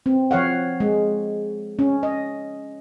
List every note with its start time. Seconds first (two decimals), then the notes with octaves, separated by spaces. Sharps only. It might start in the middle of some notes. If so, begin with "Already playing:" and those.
0.06 C4
0.31 F3 C#5 F5 F#5
0.80 G#3
1.79 C#4
2.03 D#5